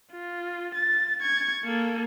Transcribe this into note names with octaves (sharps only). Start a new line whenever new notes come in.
F4
A6
C#6 G#6
A#3 A4